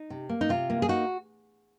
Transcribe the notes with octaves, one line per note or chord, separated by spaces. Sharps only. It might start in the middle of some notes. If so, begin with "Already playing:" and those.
Already playing: D#4
C3
A#3
D#4
C3 F4
A#3
G#4
D#4 F#4